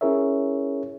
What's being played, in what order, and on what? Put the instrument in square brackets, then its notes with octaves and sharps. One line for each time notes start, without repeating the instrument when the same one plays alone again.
[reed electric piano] C#4 E4 G#4 A#4 C#5 E5